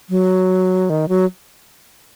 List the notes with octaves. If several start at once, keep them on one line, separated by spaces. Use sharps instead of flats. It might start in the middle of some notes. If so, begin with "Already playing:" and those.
F#3
D#3
F#3